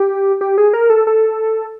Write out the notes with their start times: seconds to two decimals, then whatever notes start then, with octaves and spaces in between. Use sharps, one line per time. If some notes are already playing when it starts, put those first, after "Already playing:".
Already playing: G4
0.41 G4
0.58 G#4
0.73 A#4
0.90 A4
1.07 A4